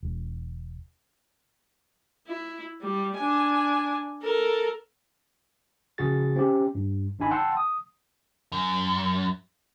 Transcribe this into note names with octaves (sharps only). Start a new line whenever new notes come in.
E1
E4
G3
D4 G#5
A4 A#4
A#1 C#3 F#4 G#4 A6
C4 C#4 G4
G2
G#1 D4 D#4 G#5 B5
F#5 G5 A5 C6 E6
D#6
F#2